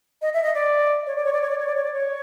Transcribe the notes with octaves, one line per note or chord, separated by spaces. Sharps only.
D#5
E5
D#5
D5
C#5
D5
C#5
D5
C#5
D5
C#5
D5
C#5
D5
C#5